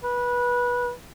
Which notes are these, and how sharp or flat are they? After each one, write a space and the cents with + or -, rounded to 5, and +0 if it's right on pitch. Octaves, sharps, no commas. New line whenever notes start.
B4 -20